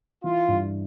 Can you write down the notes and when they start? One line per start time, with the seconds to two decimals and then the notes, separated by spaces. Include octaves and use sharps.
0.24 E3 F4
0.48 G2